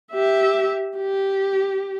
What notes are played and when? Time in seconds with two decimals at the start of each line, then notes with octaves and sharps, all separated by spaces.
0.13 G4 E5
0.97 G4